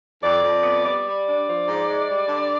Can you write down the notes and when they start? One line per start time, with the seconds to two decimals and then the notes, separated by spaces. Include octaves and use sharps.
0.22 F2 D5
0.43 F2
0.63 B3
0.84 G3 D5
1.04 G3
1.26 D4
1.46 F3
1.67 G#2
1.88 G#3
2.08 G3
2.28 D3